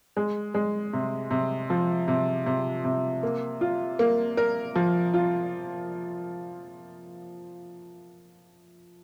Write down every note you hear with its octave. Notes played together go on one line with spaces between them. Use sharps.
G#3
G#3
C3
C3
F3
C3
C3
C3
A#3
F4
A#3
A#4
F3
F4